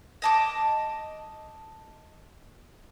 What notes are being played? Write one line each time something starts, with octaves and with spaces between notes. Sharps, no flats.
D#5 A5 D6